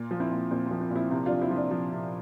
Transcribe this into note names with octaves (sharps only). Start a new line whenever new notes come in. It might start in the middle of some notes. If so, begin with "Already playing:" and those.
Already playing: A#2
F3
C4 E4
A#2
A#2 C4
C4
F3
C4
A#2
C4 E4
C3 C4 E4
D4 F4
F3
C4 E4
F3 D4
F3
C3